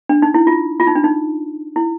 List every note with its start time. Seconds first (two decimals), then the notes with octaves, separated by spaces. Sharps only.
0.09 D4
0.22 D#4
0.34 E4
0.47 F4
0.80 F4
0.87 D#4
0.95 D4
1.04 D#4
1.76 E4